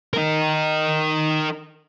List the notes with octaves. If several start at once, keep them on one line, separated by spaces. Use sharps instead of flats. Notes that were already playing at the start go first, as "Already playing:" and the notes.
D#4 A#4